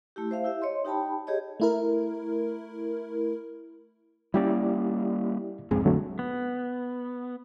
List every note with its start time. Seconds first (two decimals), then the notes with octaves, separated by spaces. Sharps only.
0.16 A3 E4 G4
0.31 C5 E5 F5
0.44 E4 G4 E5
0.62 C#5 D#5 C6
0.85 D#4 G4 G5 A5 B5
1.27 G4 G#4 C#5 D#5
1.60 A3 E4 A#4
4.34 G3 A#3 C#4 E4 G4 D5
5.71 B1 F2 G#2 G#3 C4 G#4
5.85 D3 F#3 A3
6.19 B3